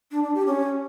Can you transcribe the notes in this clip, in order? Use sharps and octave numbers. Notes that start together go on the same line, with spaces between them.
D4
D4
G4
C#4